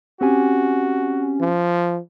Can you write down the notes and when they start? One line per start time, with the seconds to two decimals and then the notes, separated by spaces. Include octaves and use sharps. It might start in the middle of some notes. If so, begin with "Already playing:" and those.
0.21 C4 C#4 F#4 G4 G#5
1.41 F3